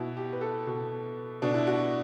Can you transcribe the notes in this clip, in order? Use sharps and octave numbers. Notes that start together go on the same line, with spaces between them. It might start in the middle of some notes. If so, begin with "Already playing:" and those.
Already playing: B2 E4
G4
B4
A4
B2
B2 D4
E4
F#4